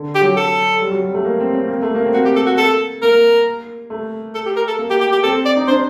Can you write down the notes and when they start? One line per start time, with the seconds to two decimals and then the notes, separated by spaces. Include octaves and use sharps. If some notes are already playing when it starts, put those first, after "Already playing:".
Already playing: D3
0.15 G4
0.22 F#3
0.37 A4
0.80 G3
0.91 F#3
1.03 G3
1.14 A3
1.25 A#3
1.40 C4
1.54 C4
1.68 A#3
1.82 A3
1.95 A#3
2.05 C4
2.14 A#3 F#4
2.25 G4
2.36 A4
2.46 F#4
2.58 A4
3.02 A#3 A#4
3.90 A3
4.35 A4
4.46 G4
4.56 A#4
4.68 A4
4.79 A#3
4.90 G4
5.01 G4
5.12 G4
5.23 C4 A4
5.45 D5
5.56 D#4
5.67 D4 C5